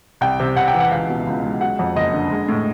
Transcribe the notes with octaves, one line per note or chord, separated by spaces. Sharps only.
C2 G5
C3
C2 F#5
G5
E3
F#5
C#2 F5
B2
C#2
G#3
F#3 F#5
F2
F#1 D#5
D3
G#3
A2